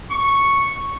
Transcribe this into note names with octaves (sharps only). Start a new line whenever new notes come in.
C#6